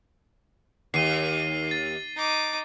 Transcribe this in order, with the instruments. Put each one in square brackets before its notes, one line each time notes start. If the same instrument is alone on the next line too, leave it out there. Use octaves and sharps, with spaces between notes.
[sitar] D#2 [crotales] C7 D#7 G7
[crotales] A6
[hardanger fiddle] D#4 D6